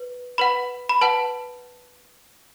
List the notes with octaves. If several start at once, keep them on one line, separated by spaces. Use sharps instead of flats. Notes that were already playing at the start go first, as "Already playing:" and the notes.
Already playing: B4
B4 F#5 B5
B5
B4 F#5 A5